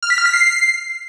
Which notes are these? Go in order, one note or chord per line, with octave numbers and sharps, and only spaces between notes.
F6
B6
F6
B6
C7